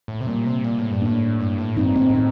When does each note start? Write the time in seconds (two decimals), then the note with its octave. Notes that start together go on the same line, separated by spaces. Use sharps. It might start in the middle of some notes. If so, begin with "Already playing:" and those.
0.08 A2
0.21 C3
0.27 A#2 G3 A#3
0.46 C3
0.65 A#2
0.78 A2
0.92 G2
1.02 A2 A#3 D4
1.40 G2
1.58 A2
1.77 G2 C4 D#4
1.96 A2 C4 D#4
2.15 C4 D#4